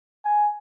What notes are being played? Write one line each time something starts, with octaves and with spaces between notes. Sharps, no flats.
G#5